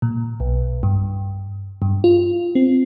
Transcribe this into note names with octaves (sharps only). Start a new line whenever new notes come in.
A#2
B1
G2
G2
F4
C4